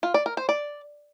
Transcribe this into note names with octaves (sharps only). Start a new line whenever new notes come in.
F4
D5
A#4
C5
D5